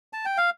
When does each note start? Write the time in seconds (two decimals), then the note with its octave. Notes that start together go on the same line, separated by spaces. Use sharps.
0.13 A5
0.25 G5
0.38 F5